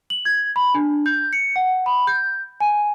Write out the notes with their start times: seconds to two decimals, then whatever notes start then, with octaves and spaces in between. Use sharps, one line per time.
0.10 F#7
0.25 G#6
0.56 B5
0.74 D4
1.06 G6
1.33 C#7
1.56 F#5
1.86 B5
2.07 G6
2.60 G#5